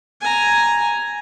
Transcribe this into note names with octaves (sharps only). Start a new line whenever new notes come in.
G#5 A#5